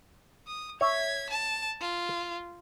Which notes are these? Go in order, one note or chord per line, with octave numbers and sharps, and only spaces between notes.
D#6
C#5 E5 G#6 B6
A5
F4